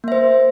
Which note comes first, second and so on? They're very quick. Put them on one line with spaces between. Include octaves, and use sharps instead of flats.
A#3 E5 C5